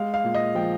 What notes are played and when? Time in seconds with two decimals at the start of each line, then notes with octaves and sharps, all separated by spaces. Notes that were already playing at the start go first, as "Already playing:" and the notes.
Already playing: G#3 F5
0.14 F5
0.24 A#2
0.34 D#5
0.55 F3 G5